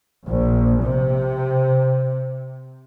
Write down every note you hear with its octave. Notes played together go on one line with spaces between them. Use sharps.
A#1
C3